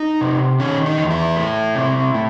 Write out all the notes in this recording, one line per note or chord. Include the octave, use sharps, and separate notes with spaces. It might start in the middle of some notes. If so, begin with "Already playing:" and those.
Already playing: D#4
C3
D#3 C#4
D#4
E2
E4
A3
C3
A2